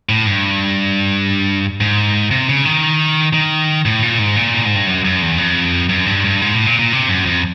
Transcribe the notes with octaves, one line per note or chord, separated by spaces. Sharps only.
A2
G2
G#2
C3
C#3
D#3
D#3
A2
A#2
G#2
A#2
A2
G#2
G2
F#2
F#2
E2
F2
F#2
G2
G2
G#2
A2
A#2
A#2
C3
F#2
F2